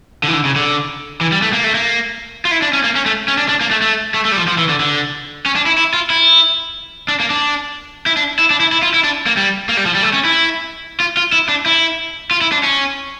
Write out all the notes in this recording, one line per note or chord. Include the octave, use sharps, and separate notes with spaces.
D3
E3
D3
C#3
D3
E3
G3
A3
A#3
A3
A#3
F4
E4
D4
C#4
A#3
C#4
A3
C#4
D4
D4
A#3
A3
A3
A3
A3
G3
F3
F3
E3
D3
D3
C#4
D4
E4
E4
F4
E4
D4
A#3
D4
E4
D4
E4
D4
E4
E4
F4
E4
D4
A#3
G3
A#3
G3
F3
G3
A3
C#4
E4
F4
F4
E4
D4
E4
F4
E4
D4
C#4